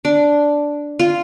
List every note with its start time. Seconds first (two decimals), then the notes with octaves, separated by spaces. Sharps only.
0.05 D4
0.99 F4